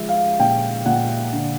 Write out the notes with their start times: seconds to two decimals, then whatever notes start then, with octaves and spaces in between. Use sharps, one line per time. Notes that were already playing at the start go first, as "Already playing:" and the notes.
Already playing: F3 G#3 E5
0.09 F5
0.40 A#2 G5
0.86 A#2 F#5
1.32 D3